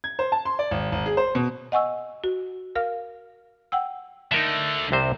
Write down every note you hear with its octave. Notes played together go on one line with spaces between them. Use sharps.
G#6
C5
A5
C6
D5
G#1
G#1
G#4
C5
B2
D#5 F#5 G#5 C#6 E6
F#4
A#4 F5 F6
F#5 G5 E6
D3 A3 D#4 A#4 E5
C2 C3 C5